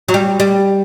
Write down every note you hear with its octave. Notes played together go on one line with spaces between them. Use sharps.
F#3
G3
G3